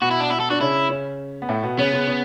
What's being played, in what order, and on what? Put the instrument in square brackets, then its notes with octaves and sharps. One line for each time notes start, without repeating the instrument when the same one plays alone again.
[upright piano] B2 B3 [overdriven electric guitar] F#4
[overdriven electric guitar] E4
D4
E4
A4
[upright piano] D4 [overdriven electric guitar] F#4
[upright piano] C#3 C#4 [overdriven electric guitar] E4
[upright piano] C#3 C#4
B3
A2 A3
B2 B3
[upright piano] C#3 C#4 [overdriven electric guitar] B3
[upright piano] C#3 C#4
C#3 C#4